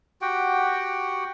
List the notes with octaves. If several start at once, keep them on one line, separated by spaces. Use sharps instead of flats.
F#4 G4 F#5 G5